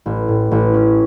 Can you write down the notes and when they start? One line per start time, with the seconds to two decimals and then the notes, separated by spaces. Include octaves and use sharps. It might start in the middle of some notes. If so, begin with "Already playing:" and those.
0.06 A1
0.28 A2
0.51 A1
0.74 C#4